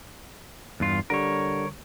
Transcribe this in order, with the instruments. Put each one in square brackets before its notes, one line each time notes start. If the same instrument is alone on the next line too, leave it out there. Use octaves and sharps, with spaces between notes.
[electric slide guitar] E2 G2 F4
[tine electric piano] D3 G3 [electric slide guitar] A#4 C#5